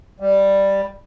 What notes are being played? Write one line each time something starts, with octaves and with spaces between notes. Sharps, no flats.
G3